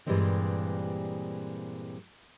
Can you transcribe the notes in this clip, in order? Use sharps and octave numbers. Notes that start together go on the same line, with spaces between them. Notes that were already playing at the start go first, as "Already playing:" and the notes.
G2 A#2 E3 G3 G#3 C4